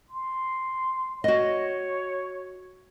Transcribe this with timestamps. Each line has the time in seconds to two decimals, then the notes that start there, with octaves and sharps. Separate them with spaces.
0.10 C6
1.24 F#4 C#5 D#5